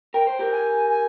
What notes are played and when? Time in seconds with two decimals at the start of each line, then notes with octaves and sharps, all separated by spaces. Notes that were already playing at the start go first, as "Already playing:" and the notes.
0.14 A#4 G5
0.27 C5
0.39 G4 A#4
0.52 G#5
0.89 G#5